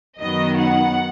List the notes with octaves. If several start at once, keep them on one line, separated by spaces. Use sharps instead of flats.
F#2 D#3 F#3 B3 D#4 D#5
F#5